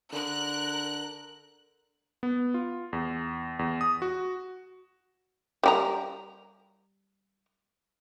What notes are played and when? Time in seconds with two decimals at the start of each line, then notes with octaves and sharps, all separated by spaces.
0.12 D3 A#4 F#6
2.23 B3
2.54 F4
2.93 E2
3.59 E2
3.81 D#6
4.02 F#4
5.63 G3 G4 A#5